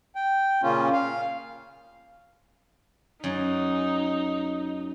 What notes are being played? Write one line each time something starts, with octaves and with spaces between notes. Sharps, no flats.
G5
A#2 C#3 A#3 C#4 F4
F5
F#2 D#4